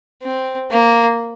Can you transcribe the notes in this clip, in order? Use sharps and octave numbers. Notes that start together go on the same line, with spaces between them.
C4
A#3